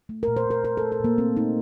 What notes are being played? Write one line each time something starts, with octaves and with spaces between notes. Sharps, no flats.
A3
A#4
A#2
C5
A#2 A#4
A#2 A#4
A4
A3
A4
A#2 A#3
A3 C4
A3 D#4